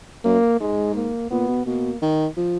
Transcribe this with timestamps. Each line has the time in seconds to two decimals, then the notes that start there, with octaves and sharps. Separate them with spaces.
0.25 F#2 A#3
0.60 G#2 G#3
0.95 A#3
1.31 A#2 B3
1.48 B2
1.66 B2 A#3
2.02 D#3
2.37 F3